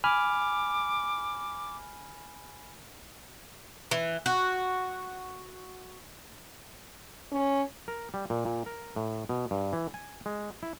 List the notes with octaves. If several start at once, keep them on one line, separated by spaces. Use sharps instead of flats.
G#5 B5 D6 F6
E3
F#4
C#4
A#4
G3
A#2
A#2
A#4
A2
B2
G2
E3
G#5
G#3
E4